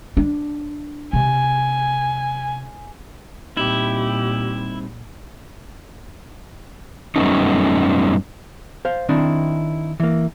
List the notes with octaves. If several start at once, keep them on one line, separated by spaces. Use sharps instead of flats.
D4
C3 G#5
A#2 G3 C4 D#4 E4 G4
F#2 G3 A3 B3 C#4 D#4
C5 F5
D#3 C4 D4 E4
E3 A#3